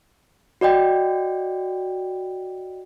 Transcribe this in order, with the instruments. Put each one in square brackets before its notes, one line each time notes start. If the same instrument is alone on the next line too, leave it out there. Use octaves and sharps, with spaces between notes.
[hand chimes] F#4 D5 D#5 G5